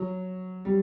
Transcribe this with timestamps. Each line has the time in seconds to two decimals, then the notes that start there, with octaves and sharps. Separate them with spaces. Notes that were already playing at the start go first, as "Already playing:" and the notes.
Already playing: F#3
0.65 G3